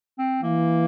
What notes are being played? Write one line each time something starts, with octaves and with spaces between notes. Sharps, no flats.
C4
E3 A#3